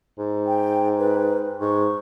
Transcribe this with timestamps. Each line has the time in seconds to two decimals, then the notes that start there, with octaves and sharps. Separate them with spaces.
0.18 G#2
0.47 G5
0.99 B4
1.60 G#2 C#6